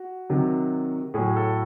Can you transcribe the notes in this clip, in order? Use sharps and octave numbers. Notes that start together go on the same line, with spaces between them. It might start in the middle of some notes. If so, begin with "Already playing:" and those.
Already playing: F#4
C3 D#3 F#3
A2 F#3 G#4
A4